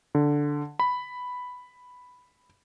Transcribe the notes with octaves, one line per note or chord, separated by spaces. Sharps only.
D3
B5